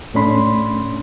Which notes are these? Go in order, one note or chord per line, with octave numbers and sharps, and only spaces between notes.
A2 A3 C#4 D4 B5 C6